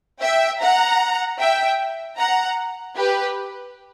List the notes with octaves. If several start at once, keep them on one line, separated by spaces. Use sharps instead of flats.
E5 G5
F#5 A#5
E5 G5
F#5 A#5
G4 B4